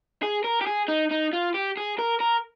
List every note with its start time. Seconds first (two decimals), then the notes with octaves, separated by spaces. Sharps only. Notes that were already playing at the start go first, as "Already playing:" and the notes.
0.23 G#4
0.45 A#4
0.61 G4
0.67 G#4
0.88 D#4
1.11 D#4
1.33 F4
1.54 G4
1.77 G#4
1.99 A#4
2.20 A#4